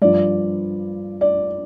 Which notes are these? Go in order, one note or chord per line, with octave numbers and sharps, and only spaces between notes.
G2 F3 D5
D5